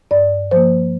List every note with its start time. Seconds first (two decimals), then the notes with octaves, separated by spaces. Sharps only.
0.11 G2 D5
0.51 F3 A#3 C5